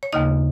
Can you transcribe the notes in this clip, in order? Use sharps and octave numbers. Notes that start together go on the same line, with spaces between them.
C#5
D#2 C#3 A#3 D#4 D#5